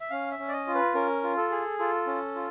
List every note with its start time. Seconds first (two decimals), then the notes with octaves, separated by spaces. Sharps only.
0.01 E5
0.10 C#4 F5
0.31 E5
0.39 C#4
0.48 D5
0.53 D#5
0.67 F4
0.74 B4
0.94 C#4 A#4
1.23 F4
1.37 A4
1.51 G#4
1.79 F4 A4
2.07 C#4
2.35 F4